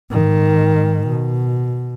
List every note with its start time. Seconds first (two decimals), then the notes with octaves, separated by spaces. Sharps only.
0.11 G#2 D#3
1.07 B2